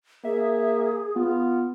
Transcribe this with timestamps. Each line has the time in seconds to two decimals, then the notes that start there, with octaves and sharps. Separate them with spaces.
0.25 A#3 G#4 E5
1.16 B3 F4